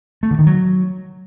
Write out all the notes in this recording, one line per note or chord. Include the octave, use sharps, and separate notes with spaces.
A3
D3
D#3
F#3